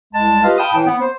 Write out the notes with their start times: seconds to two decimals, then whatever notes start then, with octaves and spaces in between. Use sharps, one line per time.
0.13 C2 G#3 A5
0.44 F4 G4 B4 D#5 F5
0.58 F5 G5 A5 B5 D#6
0.73 A2 E3 G5
0.87 B3
1.02 C5